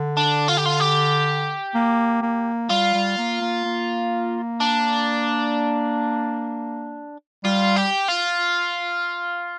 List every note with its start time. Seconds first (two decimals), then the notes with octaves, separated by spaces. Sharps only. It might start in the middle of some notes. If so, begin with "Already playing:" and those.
Already playing: D3
0.17 D4
0.48 F4
0.57 G4
0.65 F4
0.80 G4
1.75 A#3
2.22 A#3
2.70 G3 F4
2.94 G3
3.18 A#3
3.41 A#3
3.65 A#3
4.60 D4
7.44 G3 F4
7.76 G4
8.08 F4